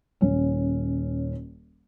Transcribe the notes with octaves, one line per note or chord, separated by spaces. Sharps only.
D#1 C#4